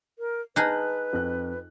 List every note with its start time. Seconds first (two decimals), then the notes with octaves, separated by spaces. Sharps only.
0.19 A#4
0.56 D#4 G#4 B4 A5 F6 F#6
1.13 F2 F#6